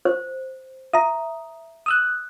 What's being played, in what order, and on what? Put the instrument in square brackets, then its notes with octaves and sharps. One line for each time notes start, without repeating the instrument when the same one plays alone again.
[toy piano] C5
[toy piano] E5 [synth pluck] A#5 D#6
[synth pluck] D#6 E6 F#6